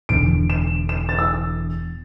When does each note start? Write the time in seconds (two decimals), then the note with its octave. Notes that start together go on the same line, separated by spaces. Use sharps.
0.09 E1 E2 D3 D7
0.50 E7
0.89 E7
1.09 A6
1.19 E6